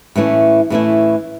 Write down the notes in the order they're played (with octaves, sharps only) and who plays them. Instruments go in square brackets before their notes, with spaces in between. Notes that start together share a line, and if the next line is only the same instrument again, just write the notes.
[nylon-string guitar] A2 E3 A3 C#4 E4
A2 E3 A3 C#4 E4